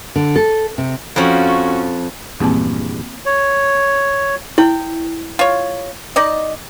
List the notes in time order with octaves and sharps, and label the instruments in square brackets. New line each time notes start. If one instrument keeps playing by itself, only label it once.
[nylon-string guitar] D3
A4
C3
[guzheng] F2 F3 [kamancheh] C#4 F#4
[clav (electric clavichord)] A#1 E2 G2 [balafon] A#3 C4 A5
[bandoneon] C#5
[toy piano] E4 [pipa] G5
[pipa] F4 C#5
D#4 D5 D#5